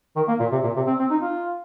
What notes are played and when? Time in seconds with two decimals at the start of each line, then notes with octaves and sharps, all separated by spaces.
0.16 D#3
0.28 A#3
0.40 A#2
0.52 C3
0.64 A#2
0.76 C3
0.87 C4
0.99 C4
1.11 D#4
1.22 F4